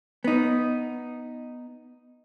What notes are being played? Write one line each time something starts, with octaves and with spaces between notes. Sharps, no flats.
B3 D#4